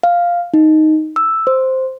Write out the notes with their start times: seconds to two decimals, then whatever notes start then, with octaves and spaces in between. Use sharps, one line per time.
0.03 F5
0.54 D#4
1.16 E6
1.47 C5